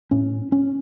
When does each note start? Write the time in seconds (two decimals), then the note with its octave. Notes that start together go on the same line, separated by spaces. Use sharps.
0.11 A2 C#4
0.52 C#4